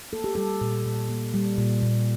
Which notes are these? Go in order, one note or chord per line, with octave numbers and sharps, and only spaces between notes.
A#3 A4
G4
G3 A4
A#2
A#2
A#3
G3
A#2
A#2